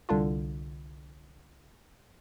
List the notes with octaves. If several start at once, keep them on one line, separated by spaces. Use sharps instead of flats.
C2 D3 D4 F4